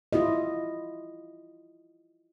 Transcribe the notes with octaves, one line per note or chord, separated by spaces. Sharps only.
E4 F4 G4 D#5